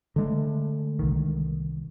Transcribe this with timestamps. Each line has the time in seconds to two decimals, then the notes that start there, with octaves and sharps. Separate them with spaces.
0.16 D3 G#3 A3
0.99 C2 D#3